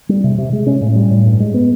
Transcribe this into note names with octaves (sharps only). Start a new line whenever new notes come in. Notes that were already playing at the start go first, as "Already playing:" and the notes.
G3
C3
C3
G#3
C#4
A2
G3
A2
G2
G#3
B3